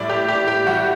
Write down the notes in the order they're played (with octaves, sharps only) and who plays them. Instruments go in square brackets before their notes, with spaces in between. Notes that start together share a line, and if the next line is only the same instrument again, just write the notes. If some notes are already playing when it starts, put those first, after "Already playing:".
Already playing: [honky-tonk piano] A2 G3 D5
G4
G4
G4
A2 G3 F#4